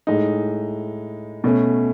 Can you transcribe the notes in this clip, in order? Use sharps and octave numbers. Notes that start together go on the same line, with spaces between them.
A2 G#3 D#4
B2 A3 C#4